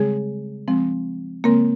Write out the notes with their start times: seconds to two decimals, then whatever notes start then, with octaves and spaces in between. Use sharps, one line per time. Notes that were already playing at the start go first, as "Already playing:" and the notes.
Already playing: C#3 G3 G#3 C4 G#4
0.67 F3 G#3 C4
1.44 C#3 G#3 A#3 C4 A#4